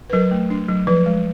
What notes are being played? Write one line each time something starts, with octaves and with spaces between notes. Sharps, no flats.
B4
F#3 A#4
A3
D4
F#3
F3 B4
G#3